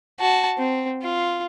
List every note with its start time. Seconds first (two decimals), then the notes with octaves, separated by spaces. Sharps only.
0.20 F#4 A5
0.58 C4
1.02 F4